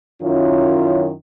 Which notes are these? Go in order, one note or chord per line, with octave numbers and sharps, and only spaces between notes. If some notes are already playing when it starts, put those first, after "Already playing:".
F#2 D#3 F#3 C#4 E4 F4